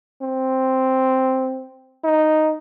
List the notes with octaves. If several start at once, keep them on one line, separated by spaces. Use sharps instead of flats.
C4
D#4